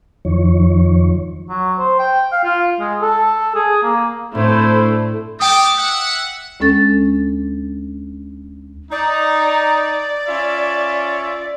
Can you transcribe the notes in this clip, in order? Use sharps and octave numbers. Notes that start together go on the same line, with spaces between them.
F2 D#3 F3 C#5
F#3
C5
G5
F5
F4
G#3
A4
G#4
A#3
A2 A3 C4 D4 E4 C5
A3 G4 G5 D6 D#6
E5 F#5
D2 G#3 C#4 A4 A6
D#4 D5
C#4 F4 E5